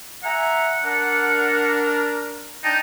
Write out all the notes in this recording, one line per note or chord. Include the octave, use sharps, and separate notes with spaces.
E5 F#5 G#5 A#5
D4 A#4
D4 D#4 G5 A5